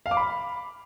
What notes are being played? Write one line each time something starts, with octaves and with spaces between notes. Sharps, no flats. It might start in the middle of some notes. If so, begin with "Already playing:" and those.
F5
D6
B5